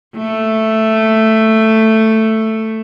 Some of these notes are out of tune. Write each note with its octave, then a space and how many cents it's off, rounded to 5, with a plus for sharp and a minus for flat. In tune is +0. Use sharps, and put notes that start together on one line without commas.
A3 +5